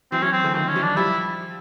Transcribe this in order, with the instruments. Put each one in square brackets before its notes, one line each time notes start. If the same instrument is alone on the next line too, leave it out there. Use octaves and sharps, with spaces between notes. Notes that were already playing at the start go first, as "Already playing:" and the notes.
[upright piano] E3 F#3 [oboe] C4
[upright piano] E3 F#3 [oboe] C#4
[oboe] C4
[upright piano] D3 E3
[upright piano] D#3 F3 [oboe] C4
[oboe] C#4
[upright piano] E3 F#3
[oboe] D4
[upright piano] F3 G3 [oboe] E4